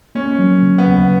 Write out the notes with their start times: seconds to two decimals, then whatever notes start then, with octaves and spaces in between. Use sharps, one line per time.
0.15 A#3 C#4
0.39 F#3
0.62 C#3
0.78 B3
0.86 D#2